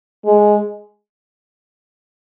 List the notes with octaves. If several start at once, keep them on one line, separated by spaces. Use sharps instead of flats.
G#3